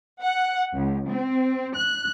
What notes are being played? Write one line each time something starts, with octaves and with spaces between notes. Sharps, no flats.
F#5
C#2
C4
F#6